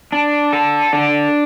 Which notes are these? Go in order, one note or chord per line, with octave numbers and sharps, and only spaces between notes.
D4
A4
D4